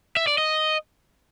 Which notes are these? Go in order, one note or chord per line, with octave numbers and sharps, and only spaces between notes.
E5
D5
D#5